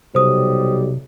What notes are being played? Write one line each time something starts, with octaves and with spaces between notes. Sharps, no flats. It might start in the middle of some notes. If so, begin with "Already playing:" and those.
B1 C3 G3 C5 D#6